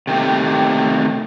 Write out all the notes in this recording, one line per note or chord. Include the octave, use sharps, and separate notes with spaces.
C3 D#3 A3 G4